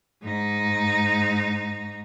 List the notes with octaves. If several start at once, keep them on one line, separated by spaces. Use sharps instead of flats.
G#2 D#4